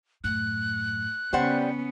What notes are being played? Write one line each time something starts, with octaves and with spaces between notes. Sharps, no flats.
F#2 A2 F#6
C#3 G3 B3 C#4 C5 F#5